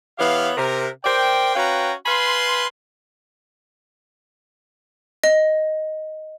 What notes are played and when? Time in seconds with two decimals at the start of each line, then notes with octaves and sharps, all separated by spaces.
0.19 E3 B3 G4 C#5 F5
0.58 C3 A#4
1.05 A#4 C5 D5 G5
1.56 C#4 F#4 B4 F5 G5 A#5
2.06 B4 F5 G#5 B5 C6
5.24 D#5